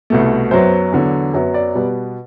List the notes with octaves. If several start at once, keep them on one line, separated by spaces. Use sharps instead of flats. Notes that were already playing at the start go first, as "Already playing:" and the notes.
C2 B2 A3
F#2 F#3 B3 C5
E2 D3 F#3
F#2 F#3 B3
D5
B2 G3 B3